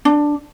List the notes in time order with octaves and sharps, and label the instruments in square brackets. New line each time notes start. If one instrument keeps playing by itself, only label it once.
[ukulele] D4